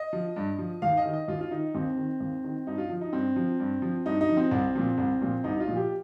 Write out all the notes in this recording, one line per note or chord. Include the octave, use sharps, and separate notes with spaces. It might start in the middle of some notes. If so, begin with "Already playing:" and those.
Already playing: D#5
F3
G2
F3
D#2 F5
D#5
D#3
D#5
D#2 F4
F4
D#3 D#4
D#2 C4
D#3
D#2
D#3
G2 D#4
F4
F3
D#4
G2 C4
F3
G2
F3
G2 D#4
D#4
F3
C4
C2
A#2 F3
C2
A#2 F3
C2 D#4
D#4
F4
A#2 F3
G4